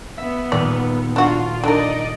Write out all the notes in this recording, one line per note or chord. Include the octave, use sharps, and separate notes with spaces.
B3 E5
D#1 D5
D4 F4 F#4
D3 D#4 A#4 D5 D#5